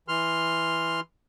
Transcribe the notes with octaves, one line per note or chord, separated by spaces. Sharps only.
E3 C6 F6